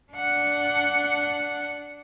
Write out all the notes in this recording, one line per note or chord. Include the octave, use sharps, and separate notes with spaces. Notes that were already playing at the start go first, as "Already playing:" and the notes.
D4 F#5